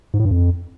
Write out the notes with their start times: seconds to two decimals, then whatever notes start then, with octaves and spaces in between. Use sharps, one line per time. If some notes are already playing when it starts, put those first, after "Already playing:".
0.14 G#2
0.20 A2
0.25 G2
0.31 F2